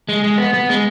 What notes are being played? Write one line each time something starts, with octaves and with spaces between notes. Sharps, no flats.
G#3
G#3
B3
B3
G#3